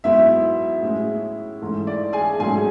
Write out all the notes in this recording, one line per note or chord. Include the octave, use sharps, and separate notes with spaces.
G#2 F#3 B3 E4 E5
A2 G#3 C#4
G#2 E3 A3 C#4
D5
G#4 G#5
G#2 F#3 A3 C#4 G#4 G#5